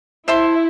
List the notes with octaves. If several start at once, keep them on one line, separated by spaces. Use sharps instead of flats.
E4 C5 E5 A5 C6